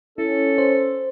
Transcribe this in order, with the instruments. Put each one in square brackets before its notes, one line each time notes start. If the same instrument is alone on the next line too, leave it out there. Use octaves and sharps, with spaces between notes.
[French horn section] C#4 [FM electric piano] E4 [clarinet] A4
[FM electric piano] C5